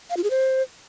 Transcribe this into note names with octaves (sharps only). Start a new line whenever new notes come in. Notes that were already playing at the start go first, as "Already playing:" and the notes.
F5
F4
G#4
C5